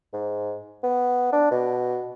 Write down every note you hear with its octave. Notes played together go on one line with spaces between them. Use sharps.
G#2
B3
D4
B2